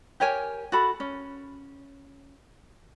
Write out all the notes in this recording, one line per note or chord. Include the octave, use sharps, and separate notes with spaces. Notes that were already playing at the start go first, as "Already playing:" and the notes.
G4 A#4 C#5 G#5
F#4 A4 B5
C#4